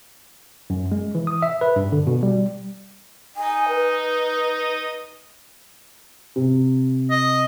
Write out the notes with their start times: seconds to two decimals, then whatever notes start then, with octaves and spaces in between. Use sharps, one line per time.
0.70 F#2
0.92 G#3
1.15 E3
1.27 D#6
1.42 E5
1.61 B4
1.76 G2
1.92 D3
2.07 B2
2.23 G3
3.37 D#4 D#5 G#5
3.69 B4
6.36 C3
7.10 D#5